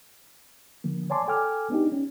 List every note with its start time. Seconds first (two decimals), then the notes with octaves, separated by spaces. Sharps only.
0.84 D3 F3 A#3
1.10 C#5 D5 G#5 A5 C6 D6
1.28 A4 G5 G#5 D6 F6
1.70 B3 D4 D#4 G4
1.92 C#4